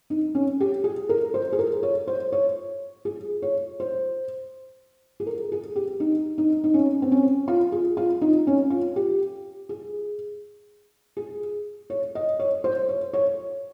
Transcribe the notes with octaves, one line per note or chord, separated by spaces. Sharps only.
D#4
C#4
G4
G#4
A#4
C5
G#4
A#4
C#5
C5
C#5
G#4
C#5
C5
G#4
A#4
G#4
G4
D#4
D#4
D#4
C#4
C4
C#4
F4
G#4
F4
D#4
C#4
F4
G4
G#4
G#4
C#5
D#5
C#5
C5
C#5
C#5